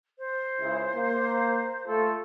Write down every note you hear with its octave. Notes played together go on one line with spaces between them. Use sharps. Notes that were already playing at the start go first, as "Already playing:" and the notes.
C5
C#2 C#3 E4
A#3
A3 F4 A4